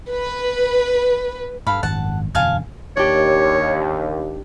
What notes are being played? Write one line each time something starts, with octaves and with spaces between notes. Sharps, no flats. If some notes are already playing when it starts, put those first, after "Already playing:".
B4
G2 A4 F5 B5
G#1 F#2 F#5 A5
E1 F#2 D3 F5 G#5 A5
D#2 D4 G4 C#5